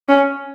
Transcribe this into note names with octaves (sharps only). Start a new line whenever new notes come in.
C#4